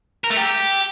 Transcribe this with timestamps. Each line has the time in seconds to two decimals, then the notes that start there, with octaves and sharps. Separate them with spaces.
0.24 A#4
0.30 A3
0.37 G4